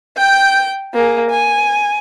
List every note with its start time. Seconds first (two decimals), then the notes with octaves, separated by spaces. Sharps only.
0.17 G5 G6
0.94 A#3 G#4
1.30 G#5